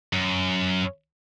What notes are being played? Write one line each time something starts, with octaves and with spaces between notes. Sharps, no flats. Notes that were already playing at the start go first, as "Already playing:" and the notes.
F#2